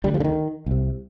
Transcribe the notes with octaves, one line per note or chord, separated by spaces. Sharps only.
D2 D3 G3
F3
D3
D#3
C2 C3